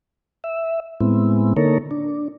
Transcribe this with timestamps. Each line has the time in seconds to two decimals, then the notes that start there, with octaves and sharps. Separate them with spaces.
0.44 E5
1.00 A2 G#3 B3 C4 E4
1.57 D3 A#3 D#4 A4 A#4 C#5
1.91 D4